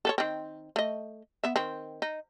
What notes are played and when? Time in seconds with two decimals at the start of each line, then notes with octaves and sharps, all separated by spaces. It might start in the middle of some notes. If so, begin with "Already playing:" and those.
0.05 A4 B4 C#5
0.18 D#3 C4
0.76 A3 D#5
1.44 B3 E5
1.56 D#3 C4
2.02 D#4